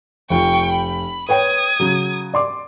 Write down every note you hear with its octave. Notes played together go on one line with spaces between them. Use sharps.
F1 F4 G5 C#6
B5
B4 C#5 G5 D#6 G#6
C#3 F#3
D5 C6 D6